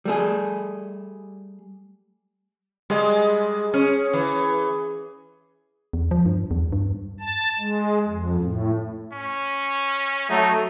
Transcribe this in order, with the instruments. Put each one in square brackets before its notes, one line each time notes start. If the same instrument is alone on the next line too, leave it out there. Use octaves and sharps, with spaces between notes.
[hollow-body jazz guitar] G3 A3 G#4
[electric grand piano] G3 G#4 D#5 [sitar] G#3
[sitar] C#4 [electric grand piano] G#4
[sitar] E3
[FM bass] E2
F3
G2
E2
G2
[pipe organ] A5
G#3
F2
A2
[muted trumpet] C#4
[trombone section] F#3 A3 [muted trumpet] D#4